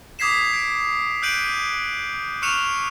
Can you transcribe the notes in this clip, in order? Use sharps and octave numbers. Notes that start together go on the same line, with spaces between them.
D6 D#6 G#6 B6 C7 E7
G#6 D7
E6 F#6 G6 D7 D#7 F#7
C#6 F6 F#6 C#7 E7 F7